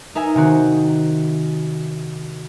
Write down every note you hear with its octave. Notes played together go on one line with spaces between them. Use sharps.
D#4 A#4 E5 G#5
C3 D#3 C4 F#4